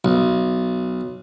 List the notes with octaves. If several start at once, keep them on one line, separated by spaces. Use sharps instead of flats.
B1